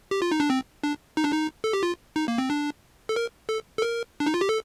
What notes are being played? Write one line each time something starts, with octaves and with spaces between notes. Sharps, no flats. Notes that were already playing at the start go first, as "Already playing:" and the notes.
G4
F4
D#4
D4
C4
D4
D#4
D4
D#4
A4
G4
F4
D#4
A#3
C4
D4
A4
A#4
A4
A4
A#4
D4
D#4
F4
G4
A4